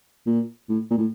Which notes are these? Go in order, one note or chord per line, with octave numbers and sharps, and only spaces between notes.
A#2
A2
A#2
A2